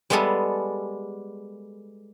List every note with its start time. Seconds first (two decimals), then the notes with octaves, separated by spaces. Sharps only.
0.10 G3 G#3 B3 G#4 A4